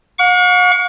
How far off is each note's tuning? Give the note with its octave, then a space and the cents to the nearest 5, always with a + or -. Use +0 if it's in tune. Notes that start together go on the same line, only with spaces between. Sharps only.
F#5 -45 C#6 +35